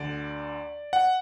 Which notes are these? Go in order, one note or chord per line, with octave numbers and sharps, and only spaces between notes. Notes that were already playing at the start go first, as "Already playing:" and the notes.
Already playing: D2 D3 D5
F#5